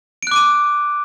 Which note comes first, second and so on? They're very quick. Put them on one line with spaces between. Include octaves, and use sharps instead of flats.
D7 F#6 D6 D#7